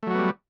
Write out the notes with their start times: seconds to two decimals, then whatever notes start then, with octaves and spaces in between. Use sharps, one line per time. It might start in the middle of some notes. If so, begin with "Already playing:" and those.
0.03 A3
0.07 F#3
0.11 F#4
0.15 B3
0.19 G3